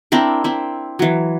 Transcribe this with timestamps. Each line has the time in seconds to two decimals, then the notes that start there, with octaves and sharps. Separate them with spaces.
0.12 C4 D4 E4 A#4
0.44 C4 E4
0.99 E3 F#3